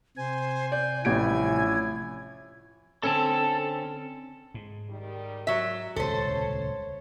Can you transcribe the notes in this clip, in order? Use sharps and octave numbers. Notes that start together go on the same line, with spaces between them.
C3 C5 G#5
D5 G6
A1 F3 G3 C#4 E4 G#6 D7
D3 C4 C#4 A4 A5
G#2
D#3 G3
F#3 E5
D#1 C#2 C3 A4 C5 C#5